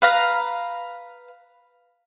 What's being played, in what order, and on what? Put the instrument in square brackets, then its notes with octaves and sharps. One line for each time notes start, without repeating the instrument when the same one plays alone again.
[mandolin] B4 F5 A#5